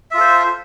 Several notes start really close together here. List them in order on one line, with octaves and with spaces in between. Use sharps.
E5 F4 A4 C5